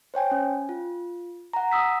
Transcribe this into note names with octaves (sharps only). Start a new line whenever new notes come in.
C5 C#5 G5 G#5
C#4
F4
F#5 A#5
D#6 E6 B6